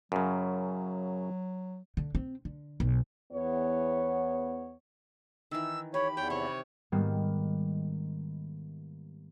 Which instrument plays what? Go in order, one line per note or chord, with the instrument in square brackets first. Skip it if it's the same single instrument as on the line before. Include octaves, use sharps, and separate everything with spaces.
[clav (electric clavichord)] F#2 C#3 [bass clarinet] F#3
[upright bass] D3
C4
D3
B1
[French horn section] E2 B3 C#5
[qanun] D#3 E3 [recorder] E6
[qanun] G4 [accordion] C#5 [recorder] B5
[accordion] E2 [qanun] C#5 [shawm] G5
[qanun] C3 [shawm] C#5
[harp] G#2 D#3 G3 A#3 B3